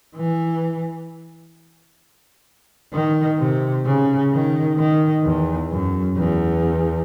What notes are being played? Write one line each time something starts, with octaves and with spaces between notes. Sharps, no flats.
E3
D#3
C3
C#3
D#3
D#3
E2
F#2
E2